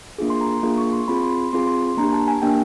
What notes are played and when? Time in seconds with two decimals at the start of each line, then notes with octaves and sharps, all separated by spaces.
0.18 A#3 D4 F4 G#4
0.30 C6
0.41 A#5
0.63 A#3 D4 F4 G#4
0.78 C#6
0.93 C6
1.08 C4 F4 G#4 B5
1.23 C6
1.53 C4 F4 G#4 C6
1.67 C6
1.83 C6
1.97 A#3 D4 G4 A#5
2.13 A5
2.28 G#5
2.42 A#3 D4 G4 G5